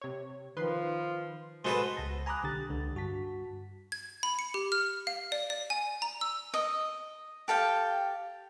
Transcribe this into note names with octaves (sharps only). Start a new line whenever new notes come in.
C3 C#5
D#3 F3 B4 C6
C3 G#3 B3 F#4 A4 B4 C5
C#2 F#5 A5 A#6
G#5 A#5 B5 D6 D#6 F#6
B1 D3 G4 A6
C#2 D3
G2 F#4 A5 B6
G#6
B5
C#7
G4
F6
F5
D5
D5
G#5
A#5
E6
D#5
G4 A4 F5 G5